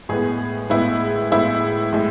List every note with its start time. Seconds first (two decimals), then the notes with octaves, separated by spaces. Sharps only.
0.09 A2 G#3 B3 G#4
0.70 A2 G#3 B3 E4
1.31 A2 G#3 B3 E4
1.93 A2 G#3